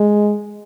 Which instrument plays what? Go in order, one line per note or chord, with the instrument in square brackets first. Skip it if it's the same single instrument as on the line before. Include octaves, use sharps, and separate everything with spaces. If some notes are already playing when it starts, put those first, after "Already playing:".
Already playing: [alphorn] G#3